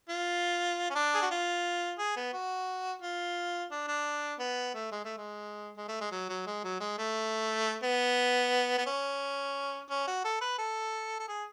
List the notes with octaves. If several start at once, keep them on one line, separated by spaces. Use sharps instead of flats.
F4
C#4
D4
G#4
F#4
F4
G#4
B3
F#4
F4
D4
D4
B3
A3
G#3
A3
G#3
G#3
A3
G#3
F#3
F#3
G#3
F#3
G#3
A3
B3
B3
C#4
C#4
F#4
A4
B4
A4
A4
G#4